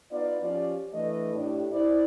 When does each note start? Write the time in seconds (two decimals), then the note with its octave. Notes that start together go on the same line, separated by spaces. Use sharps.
0.12 B3 D#4 F4 D5
0.42 F3 C#4 F4 G4 D5
0.92 E3 A3 D4 B4 D#5
1.33 A2 D4 G4
1.72 E4 C5 D5